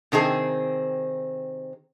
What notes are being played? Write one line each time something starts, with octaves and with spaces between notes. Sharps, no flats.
C3 D#3 C4 G#4